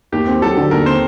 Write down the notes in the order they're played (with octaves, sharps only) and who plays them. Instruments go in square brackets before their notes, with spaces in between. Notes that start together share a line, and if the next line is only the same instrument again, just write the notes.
[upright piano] D#2 [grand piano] G4
[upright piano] C4
[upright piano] F#3 [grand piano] A4
[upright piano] D3
[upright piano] D#2 [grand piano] A#4
[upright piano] C4 [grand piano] C5